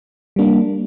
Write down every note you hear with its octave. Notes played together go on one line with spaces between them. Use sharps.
G3 A#3 D4